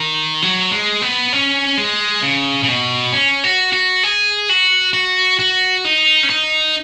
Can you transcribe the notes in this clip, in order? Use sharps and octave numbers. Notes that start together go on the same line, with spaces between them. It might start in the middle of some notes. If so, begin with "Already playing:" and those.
Already playing: D#3
F#3
G#3
B3
C#4
G#3
C#3
C#3
B2
C#4
F#4
F#4
G#4
F#4
F#4
F#4
D#4
C#4
D#4